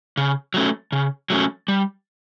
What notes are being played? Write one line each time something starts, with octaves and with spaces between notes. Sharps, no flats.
C#3
F#3 A3 C#4
C#3
F#3 A3 C#4
G3